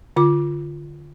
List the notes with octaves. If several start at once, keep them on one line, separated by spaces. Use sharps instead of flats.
D3 F4 D6